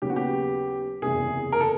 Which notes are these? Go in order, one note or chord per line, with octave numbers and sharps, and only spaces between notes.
D#2 C#3 F#3 B3 G4
F#4
G4
F#1 E2 C3 G#4
A#4
A4